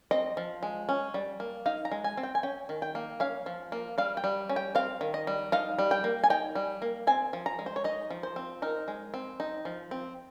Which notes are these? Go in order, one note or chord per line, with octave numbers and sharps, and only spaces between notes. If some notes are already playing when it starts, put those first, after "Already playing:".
C4 D#5
F3
G#3
C#4
G3
A#3
D#4 F5
A#5
G#3
G#5
C4
G5
G#5
C#4 G5
D#3
G5
A#3
C#4 F5
F3
A#3
G3 F5
G5
G3
C#4
G5
C4 F5
D#3
D#5
G3
D#4 F5
G3
G5
A#3
G#5
D#4 G5
G3
A#3
C4 G#5
F3
A#5
G#3
C5
C#5
D#4 D#5
F3
C5
C4
D#4 A#4
G#3
C4
D#4
F3
C4